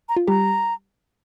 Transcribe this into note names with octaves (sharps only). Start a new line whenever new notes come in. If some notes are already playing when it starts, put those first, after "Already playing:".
A#5
F4
G3 G4 A#5